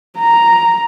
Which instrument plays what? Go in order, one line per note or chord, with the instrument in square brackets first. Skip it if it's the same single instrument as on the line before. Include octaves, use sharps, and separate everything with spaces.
[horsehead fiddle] A#5